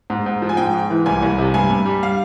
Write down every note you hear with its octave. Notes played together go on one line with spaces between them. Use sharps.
G#2
G#2
F3
G#5
G#2 G5
G#2
E3
C2 G#5
C2
C3
G2 G#5
G2
G3
F5